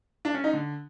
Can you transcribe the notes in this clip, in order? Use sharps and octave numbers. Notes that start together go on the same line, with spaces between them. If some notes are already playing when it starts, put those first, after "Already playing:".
D4
C#4
D#4
D3